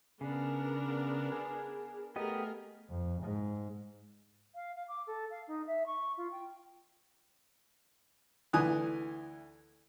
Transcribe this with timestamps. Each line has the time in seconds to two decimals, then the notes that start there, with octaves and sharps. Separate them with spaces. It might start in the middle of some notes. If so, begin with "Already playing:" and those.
0.21 C#3 B3 D4 A#4
1.32 G#4
2.16 A3 B3 G4 G#4 A#4 D#5
2.90 F2
3.21 G#2
4.55 F5
4.75 F5
4.88 D6
5.06 A4
5.30 F5
5.47 D#4
5.66 E5
5.86 C#6
6.17 F4
6.31 G5
8.53 D2 E3 G#5 D#6 F#6